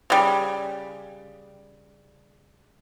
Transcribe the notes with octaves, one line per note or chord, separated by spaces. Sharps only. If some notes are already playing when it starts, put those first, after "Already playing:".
C#3 G3